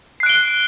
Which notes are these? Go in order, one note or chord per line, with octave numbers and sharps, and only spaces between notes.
F#6 C7 D7 G7